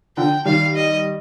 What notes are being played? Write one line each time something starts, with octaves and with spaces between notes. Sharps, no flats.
D3 F3 G5
D#3 G3 F5
D#5